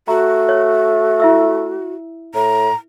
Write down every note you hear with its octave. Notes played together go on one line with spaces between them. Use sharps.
A3 F#4 A#5
C#5
E4 E5 E6
A2 A#5